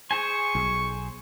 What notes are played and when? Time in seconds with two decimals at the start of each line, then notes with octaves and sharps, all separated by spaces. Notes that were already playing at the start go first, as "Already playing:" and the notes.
0.11 G#4 C5 G#5 C#6
0.55 B1